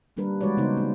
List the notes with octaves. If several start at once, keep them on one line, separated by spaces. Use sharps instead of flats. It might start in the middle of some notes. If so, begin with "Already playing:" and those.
D#3 G3 A#3 D4 A#4 B4
E3 G#3 F#4 B4 C#5 D5
C#3 B3 D#4 C5
A#3